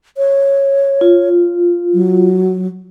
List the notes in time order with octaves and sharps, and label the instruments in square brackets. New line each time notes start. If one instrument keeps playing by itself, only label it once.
[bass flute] C#5
[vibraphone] F4
[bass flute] F#3